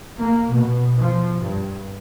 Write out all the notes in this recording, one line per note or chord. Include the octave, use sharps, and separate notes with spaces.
A#3
B2
F3
G2